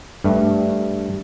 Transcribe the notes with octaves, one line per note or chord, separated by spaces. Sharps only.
G2 G3 A3